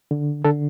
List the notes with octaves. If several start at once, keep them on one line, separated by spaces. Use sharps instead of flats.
D3
D3 A4